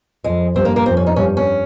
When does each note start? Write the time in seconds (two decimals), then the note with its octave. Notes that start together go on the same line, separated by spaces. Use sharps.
0.24 F2 G#3
0.55 G2 C4
0.65 A#3
0.76 A#3
0.86 F2 C4
0.97 C#4
1.06 D#4
1.16 G2 C#4
1.37 C#4